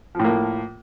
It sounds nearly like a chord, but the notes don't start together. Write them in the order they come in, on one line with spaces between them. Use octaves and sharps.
F3 A2 A#3